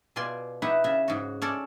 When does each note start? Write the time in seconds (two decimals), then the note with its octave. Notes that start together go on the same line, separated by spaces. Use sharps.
0.16 B2 F4 D5 G#5 C6
0.62 D#4 E4 G4 B4 E5 F#5
0.84 C#3 E5
1.08 G#2 F#4
1.42 C#4 A4 D5